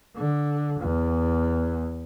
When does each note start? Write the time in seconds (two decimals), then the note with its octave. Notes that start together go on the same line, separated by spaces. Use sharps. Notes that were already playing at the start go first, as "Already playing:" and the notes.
0.17 D3
0.80 E2